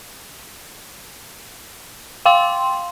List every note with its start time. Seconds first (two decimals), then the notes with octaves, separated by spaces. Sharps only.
2.25 F5 G5 C6